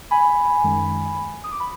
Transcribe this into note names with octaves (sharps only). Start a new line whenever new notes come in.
G#5 B5
F#2 D#3 G#3
D#6
D6
B5